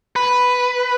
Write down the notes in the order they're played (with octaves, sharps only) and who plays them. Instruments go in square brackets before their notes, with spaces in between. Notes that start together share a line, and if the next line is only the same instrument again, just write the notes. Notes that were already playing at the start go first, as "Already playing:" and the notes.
[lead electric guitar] B4